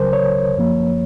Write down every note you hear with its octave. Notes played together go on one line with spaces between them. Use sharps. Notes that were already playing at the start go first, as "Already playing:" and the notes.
Already playing: C#2 C#3 F#3 A#4 C5
C#5
F#2 F3 A#3